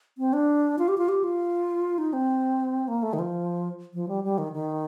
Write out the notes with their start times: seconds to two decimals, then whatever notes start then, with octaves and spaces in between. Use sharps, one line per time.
0.18 C4
0.33 D4
0.79 F4
0.88 G4
0.98 F4
1.09 G4
1.24 F4
1.98 D#4
2.13 C4
2.88 A#3
3.03 A3
3.13 D#3
3.19 F3
3.94 F3
4.08 G3
4.24 G3
4.38 D#3
4.53 D#3